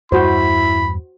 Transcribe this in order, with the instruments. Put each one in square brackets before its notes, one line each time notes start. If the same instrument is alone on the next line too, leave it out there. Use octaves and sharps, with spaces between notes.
[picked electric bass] E2 G2 G3 [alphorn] E4 [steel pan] F#4 C5 [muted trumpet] B5